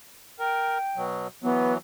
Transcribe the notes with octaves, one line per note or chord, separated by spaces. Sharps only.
A#4 G5
B2 F#3
E3 F#3 B3